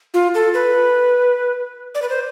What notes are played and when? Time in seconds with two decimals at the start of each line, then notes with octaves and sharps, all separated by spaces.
0.14 F4
0.35 A4
0.54 B4
1.95 D5
2.02 B4
2.09 C5